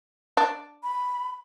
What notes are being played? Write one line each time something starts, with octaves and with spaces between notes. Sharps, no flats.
D4
B5